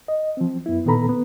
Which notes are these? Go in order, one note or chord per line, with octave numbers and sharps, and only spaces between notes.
D#5
F3 C4
F#2 B3 E4
A#2 D#3 B3 A4 A#5 B5
B3